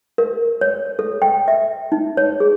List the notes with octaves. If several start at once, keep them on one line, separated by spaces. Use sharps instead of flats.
A#4
C#5
A4
G5
E5
D#4
C#5
G#4